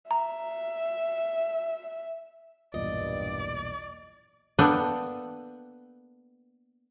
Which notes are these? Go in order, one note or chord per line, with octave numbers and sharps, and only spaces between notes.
E5 A#5
B1 E2 G2 A#2 D5 D#5
A#3 B3 D4 A4 B4 G5